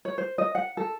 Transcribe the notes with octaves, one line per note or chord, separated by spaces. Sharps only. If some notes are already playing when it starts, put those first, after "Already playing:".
C#5
C5
D#5
F#5
A4